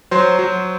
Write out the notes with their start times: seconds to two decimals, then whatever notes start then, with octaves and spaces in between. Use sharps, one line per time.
0.11 F#3 C5 C6
0.39 F#3